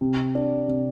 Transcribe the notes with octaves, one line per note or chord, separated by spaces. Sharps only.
C3
D4
C3